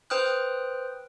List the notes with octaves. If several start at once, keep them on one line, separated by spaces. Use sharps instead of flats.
B4 C5 G5 D#6 F6 F#6